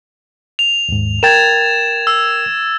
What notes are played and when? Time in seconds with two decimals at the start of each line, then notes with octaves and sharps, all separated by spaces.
0.59 F7
0.89 D#2 G#2
1.23 A#4 G5 G#6 A6 E7
2.07 E6